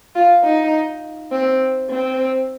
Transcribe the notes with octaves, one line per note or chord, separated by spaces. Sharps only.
F4
D#4
C4
C4